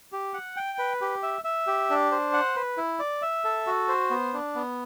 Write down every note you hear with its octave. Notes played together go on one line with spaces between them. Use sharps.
G4
F#5
G5
B4
G4
E5
E5
G4
D4
C5
F#5
B4
E4
D5
E5
A4
F#4
C5
B3
D4
B3